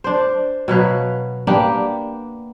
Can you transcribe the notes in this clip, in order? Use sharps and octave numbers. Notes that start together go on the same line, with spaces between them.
D4 C5
B2 F#3 B4 F5
A#3 B3 D4 G4